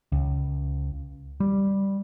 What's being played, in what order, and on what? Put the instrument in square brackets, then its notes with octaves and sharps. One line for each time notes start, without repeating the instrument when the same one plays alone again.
[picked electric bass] C#2
G3